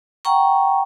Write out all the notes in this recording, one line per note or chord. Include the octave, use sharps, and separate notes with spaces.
F#5 G5 A#5 C#6